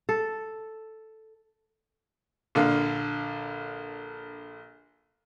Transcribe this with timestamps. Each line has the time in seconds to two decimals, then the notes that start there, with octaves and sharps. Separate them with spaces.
0.09 A4
2.55 A#1 D3 F5